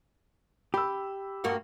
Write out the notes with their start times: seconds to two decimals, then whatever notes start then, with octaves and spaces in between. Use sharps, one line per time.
0.74 G4 B5 E6
1.44 G2 A#3 F#4